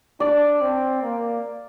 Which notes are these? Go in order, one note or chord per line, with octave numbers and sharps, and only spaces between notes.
D4 D5
C4
A#3